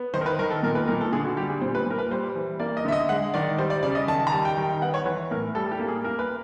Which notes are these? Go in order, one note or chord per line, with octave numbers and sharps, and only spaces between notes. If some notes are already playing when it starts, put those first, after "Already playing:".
Already playing: B3
D#3 C5
A#4
B4
D#3 A#4
A4
A#2 A#4
B4
A#2 A#4
A4
D3 G#4
F#4
G3 G4
G#4
A#2 C5
B4
A#2 A#4
B4
G3 C5
E3
A#3 D5
D#5
D3 E5
D#5
G#3 F#5
D#3 D5
G3 C5
D5
C#3 D5
D#5
D#3 A5
A5
A#5
G3 A5
G5
D#3
G5
B3 F#5
C#5
E3 B4
A2 A#4
G3 A4
G4
A#3
G#4
A#3 A#4
B4